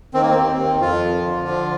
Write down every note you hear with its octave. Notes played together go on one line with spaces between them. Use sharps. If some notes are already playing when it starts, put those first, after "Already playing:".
D#3 C4
A#3
C4
D#2
D#3
F2 F4
F3
D3
F3